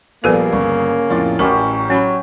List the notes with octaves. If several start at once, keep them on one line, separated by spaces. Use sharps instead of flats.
A#1 F3 G3 A#3 B3 G#4 A4 B4
G1 C#3
F2 A2 F4 D5 F5
A1 F#3 C#4 G4 A#4
F#3 C#4 B5